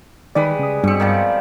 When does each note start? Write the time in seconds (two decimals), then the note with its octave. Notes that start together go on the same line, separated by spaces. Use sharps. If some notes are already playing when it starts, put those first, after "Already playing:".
0.35 D#3 G3 G#3 B4 D5
0.59 C#3 D#6
0.84 G2 B2 C4 C#7
1.00 D#3 F3 G3